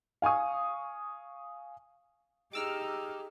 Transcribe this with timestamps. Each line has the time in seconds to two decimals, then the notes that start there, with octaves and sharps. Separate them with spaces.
0.22 F5 G#5 C#6 D#6
2.53 D#4 G4 G#4 D6 E6 F6